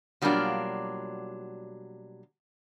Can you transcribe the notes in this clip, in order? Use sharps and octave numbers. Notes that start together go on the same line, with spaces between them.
B2 F#3 G3 A#3 D4 F4